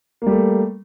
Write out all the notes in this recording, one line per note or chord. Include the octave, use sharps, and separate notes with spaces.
G3 A3 A#3